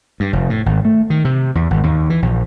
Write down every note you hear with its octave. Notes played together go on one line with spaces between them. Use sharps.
G2
F1
A2
G#1
A3
D#3
C3
E2
G#1
D#2
E3
A#1